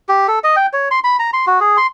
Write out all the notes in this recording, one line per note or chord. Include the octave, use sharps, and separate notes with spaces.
G4
A4
D#5
G5
C#5
C6
B5
A#5
C6
F#4
G#4
C6